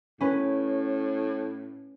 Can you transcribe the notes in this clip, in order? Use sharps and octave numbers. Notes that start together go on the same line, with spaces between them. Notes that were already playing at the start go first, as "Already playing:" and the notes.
A2 C#4 B4